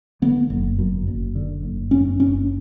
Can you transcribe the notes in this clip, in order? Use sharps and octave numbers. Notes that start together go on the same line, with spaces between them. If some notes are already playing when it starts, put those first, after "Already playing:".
D3 B3
F#1
F#2
F#1
D3
F#1
F#2 C#4
F#1 C#4